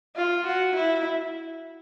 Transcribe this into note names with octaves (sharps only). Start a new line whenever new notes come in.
F4
F#4
E4